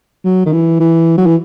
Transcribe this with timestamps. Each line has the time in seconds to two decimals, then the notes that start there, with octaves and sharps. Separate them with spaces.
0.25 F#3
0.46 D#3
0.52 E3
0.80 E3
1.18 F#3
1.26 E3